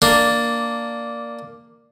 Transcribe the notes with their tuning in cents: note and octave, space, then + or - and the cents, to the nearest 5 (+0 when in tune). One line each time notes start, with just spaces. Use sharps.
A#3 +0 D4 +0